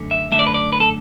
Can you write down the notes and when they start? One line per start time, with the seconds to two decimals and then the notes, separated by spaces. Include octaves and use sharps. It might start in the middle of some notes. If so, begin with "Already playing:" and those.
Already playing: F#2 D3 A3
0.11 E5
0.31 F#2 D3 A3 E5
0.39 D5
0.47 B4
0.54 D5
0.72 B4
0.80 A4